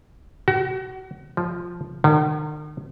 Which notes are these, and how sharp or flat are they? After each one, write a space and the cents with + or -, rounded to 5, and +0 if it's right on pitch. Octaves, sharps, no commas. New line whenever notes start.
F#4 +35
F3 +0
D#3 -45